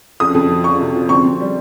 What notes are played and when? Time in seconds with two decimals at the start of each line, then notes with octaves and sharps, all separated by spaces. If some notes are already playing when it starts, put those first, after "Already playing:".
0.20 F2 D#6
0.34 F2
0.50 F3
0.64 F3 C#6
0.80 C3
0.95 F3
1.09 C4 C#6
1.25 C4
1.40 G3